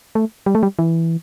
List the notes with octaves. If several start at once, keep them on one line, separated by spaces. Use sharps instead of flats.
A3
G3
A3
G3
E3